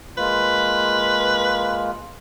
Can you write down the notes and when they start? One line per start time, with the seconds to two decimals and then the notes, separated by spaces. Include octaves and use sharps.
0.17 G#3 A#3 F4 B4